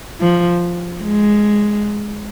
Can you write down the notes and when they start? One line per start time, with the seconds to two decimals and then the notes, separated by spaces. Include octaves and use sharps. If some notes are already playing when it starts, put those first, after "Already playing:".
0.20 F3
1.03 G#3